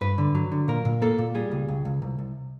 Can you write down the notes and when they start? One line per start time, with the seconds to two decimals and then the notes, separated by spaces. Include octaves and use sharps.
0.01 G2 B4
0.18 D3
0.35 F#3
0.52 D3
0.68 A#2 A#4
0.85 A#2
1.02 A#3 A4
1.18 A#2
1.35 G3 G#4
1.51 C#2
1.68 C#2
1.85 C#2
2.02 C2
2.19 C2